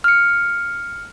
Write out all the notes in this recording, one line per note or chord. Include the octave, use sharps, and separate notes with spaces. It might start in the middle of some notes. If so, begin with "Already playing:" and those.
F6 C#7